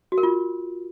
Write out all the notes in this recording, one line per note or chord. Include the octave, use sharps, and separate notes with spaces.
F#4
A#4
F4